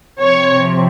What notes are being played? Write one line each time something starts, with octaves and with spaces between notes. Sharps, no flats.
C3 F3 C4 C#5